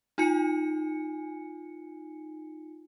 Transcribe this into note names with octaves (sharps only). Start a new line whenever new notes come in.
D#4 F4 G#5 C#7